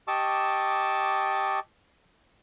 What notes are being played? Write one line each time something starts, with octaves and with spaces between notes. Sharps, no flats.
G4 D#5 A5 C#6 D6 E6